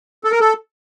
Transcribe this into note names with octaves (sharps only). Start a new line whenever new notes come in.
A4
A#4
A4